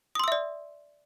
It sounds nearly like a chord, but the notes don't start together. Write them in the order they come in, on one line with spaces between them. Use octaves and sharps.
D#6 C6 E6 E5 D5